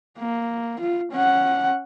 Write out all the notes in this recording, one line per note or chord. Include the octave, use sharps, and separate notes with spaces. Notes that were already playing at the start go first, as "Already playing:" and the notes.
A#3
F4
C#4 F#5